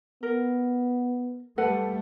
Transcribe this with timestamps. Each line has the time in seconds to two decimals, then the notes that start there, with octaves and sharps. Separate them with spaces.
0.23 B3 A#4
1.58 G3 A3 A4 B4 F#5